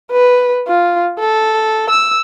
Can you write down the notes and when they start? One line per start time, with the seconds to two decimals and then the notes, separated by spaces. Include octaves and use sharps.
0.11 B4
0.67 F4
1.19 A4
1.90 E6